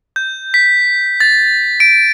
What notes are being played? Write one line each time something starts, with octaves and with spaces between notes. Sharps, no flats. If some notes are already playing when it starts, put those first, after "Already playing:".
G6
B6
A6
D7